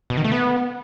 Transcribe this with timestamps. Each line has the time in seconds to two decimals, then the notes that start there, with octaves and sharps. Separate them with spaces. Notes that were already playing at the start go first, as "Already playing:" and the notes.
0.10 B2
0.17 D#3
0.24 A3
0.32 B3